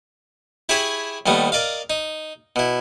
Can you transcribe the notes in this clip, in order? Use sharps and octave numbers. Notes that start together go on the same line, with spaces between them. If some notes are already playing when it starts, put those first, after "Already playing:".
E4 G4 G#4 C#5 E5 B5
D#2 G3 A3 B3
A#4 D5 D#5 F5
D#4
B2 E4